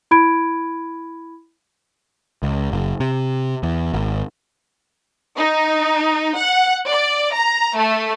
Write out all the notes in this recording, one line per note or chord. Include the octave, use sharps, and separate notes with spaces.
E4 B5 G#6 D7
C#2
F#1
C3
E2
G#1
D#4
F#5
D5
A#5
A3